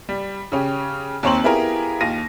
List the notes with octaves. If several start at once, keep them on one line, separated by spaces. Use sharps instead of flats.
G3
C#3 C#4 G4
D#2 C4 C#5 A#5 C6 F#7
B3 E4 F4 G4 G#4 A#4
D#2 F4 A#6 D#7